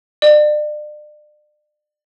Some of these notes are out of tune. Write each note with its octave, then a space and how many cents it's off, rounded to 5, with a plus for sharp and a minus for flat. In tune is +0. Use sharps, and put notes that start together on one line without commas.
D5 +35